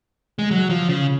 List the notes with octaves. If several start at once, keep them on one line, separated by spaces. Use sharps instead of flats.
G#3
F#3
F3
C#3